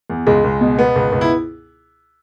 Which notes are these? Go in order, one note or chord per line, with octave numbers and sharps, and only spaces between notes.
E2
C#2 G#3
C#2
B2
B2 B3
C#2
C#2
E4